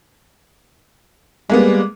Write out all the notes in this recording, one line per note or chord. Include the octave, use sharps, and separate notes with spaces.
G3 G#3 A#3 B3